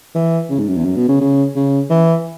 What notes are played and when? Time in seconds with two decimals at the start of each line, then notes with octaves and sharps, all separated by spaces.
0.15 E3
0.50 C#3
0.59 G#2
0.68 F#2
0.77 E2
0.85 F#2
0.96 B2
1.09 C#3
1.21 C#3
1.56 C#3
1.90 E3